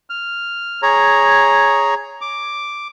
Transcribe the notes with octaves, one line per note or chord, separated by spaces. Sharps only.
F6
G#4 C#5 A#5
D6